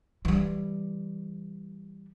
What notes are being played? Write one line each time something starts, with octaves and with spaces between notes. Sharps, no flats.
E3 G3